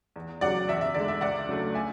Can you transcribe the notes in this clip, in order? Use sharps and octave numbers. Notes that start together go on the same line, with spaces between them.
E2
C#3 F#3 D5 F#5
E2 E5
E5
D3 G#3 D5
E5
C#2 D5 F#5
C#3 F#3 A3 D4
E5 G#5